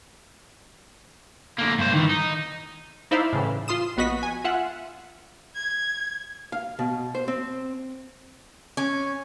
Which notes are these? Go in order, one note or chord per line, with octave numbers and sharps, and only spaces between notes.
D3 A#3
G2 C5
D#3 E3
D#4
D#4 E4 C5 D5 E5 F5
A2 C#3 E3
F4 C6 D#6 E7
A#1 B3 F#4 D#5 B6
G#5
F4 E5 F#5
G#6
F5
B2
C5
C4
C#4